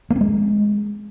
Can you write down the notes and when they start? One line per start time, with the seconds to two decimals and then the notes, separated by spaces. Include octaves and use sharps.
0.10 A#3
0.16 C4
0.21 G#3